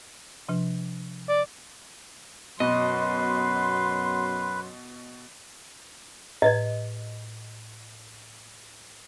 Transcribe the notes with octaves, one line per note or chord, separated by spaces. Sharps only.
C3 F3 D4
D5
F#2 B2 F#3 B4 D#5 C6
A2 B4 D#5 G#6